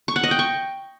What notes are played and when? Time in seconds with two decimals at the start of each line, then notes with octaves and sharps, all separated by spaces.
0.08 C#6
0.16 F#5
0.23 D#5
0.31 G5
0.39 C#6